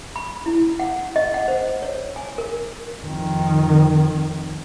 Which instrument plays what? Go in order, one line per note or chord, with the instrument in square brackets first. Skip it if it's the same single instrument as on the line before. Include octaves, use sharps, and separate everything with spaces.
[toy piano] B5
E4
F#5
D#5
F#5
C5
C#5
G#5
A#4
[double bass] F2 D#3